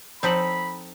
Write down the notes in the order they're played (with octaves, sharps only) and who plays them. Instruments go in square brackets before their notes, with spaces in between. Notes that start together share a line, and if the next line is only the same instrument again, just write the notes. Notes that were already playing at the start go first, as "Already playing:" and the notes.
[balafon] F3 [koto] C4 D#4 A4 [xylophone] C5 B6 F#7 [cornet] B5